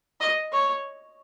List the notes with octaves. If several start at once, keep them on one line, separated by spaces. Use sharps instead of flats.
D#5
C#5